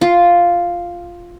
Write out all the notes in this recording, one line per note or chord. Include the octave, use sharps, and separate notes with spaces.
F4